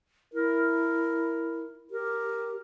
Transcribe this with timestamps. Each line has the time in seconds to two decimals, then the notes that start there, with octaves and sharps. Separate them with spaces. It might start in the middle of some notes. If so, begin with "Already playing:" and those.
0.34 E4 A#4
1.91 G4 A#4